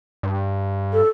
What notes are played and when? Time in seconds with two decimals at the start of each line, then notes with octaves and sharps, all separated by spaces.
0.23 G2
0.93 A4